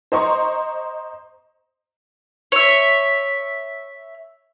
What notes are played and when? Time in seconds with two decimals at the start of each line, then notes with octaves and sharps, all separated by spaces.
0.12 C5 D#5 A#5 C6 C#6
2.52 C#5 E5